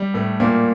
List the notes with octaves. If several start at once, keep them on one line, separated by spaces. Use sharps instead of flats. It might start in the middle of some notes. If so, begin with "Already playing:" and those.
Already playing: G3
A2 A3
A#2 A#3